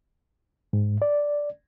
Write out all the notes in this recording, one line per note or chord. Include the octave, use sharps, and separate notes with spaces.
G#2
D5